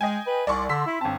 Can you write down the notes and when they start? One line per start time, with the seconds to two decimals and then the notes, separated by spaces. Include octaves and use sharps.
0.01 G#3 D#5 G5 G#5
0.27 B4
0.47 C2 D5 C6 C#6
0.69 D3 C6 E6 B6
0.86 E4
1.01 G1 C4 A5